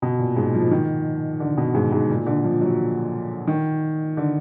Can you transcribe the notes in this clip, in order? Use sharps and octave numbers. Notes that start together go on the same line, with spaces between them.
B2
A#2
G#2
F3
D#3
D3
B2
G#2
G#2
A#2
D3
F3
F#3
D#3
D3